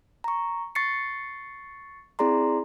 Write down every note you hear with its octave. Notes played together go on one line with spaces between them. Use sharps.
A#5 C#6
C#6 A6 C7 C#7
C4 E4 G#4 D5 A#5 C6